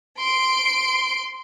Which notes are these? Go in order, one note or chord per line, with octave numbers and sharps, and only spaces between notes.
C6 D7